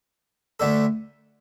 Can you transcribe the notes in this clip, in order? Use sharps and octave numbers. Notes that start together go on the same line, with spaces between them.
D2 D3 A3 D4 A4